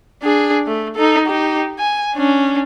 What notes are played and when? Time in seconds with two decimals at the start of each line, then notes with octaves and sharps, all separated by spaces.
0.22 D4 G#4
0.67 A3
0.96 D#4 A4
1.27 D#4 G4
1.79 G#5
2.14 C#4 D4